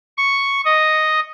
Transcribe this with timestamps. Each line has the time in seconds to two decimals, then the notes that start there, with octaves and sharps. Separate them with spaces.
0.18 C#6
0.65 D#5